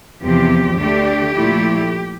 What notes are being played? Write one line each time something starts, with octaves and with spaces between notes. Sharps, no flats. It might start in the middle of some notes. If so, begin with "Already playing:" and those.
E2 C3 F3 G4
D2 D3 A3 D4 G4
A#2 F3 A3 E4